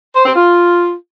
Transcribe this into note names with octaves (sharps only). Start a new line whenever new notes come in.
C5
C4
F4